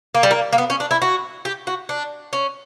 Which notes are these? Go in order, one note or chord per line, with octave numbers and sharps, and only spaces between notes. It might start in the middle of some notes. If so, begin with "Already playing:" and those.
A#3
G3
A#3
A#3
B3
C#4
D4
E4
F#4
G4
F#4
D4
C#4